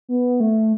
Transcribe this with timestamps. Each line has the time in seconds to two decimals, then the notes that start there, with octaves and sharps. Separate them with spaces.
0.09 B3
0.40 A3